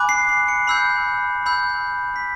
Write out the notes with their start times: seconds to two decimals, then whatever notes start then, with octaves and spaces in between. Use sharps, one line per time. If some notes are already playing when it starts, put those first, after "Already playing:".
Already playing: G#5 B5 D6 F#6
0.09 C7
0.29 C7
0.48 C#7
0.67 B5 E6 G6 C7
1.46 B5 E6 G6
2.16 B6